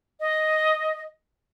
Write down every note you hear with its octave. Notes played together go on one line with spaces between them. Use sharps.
D#5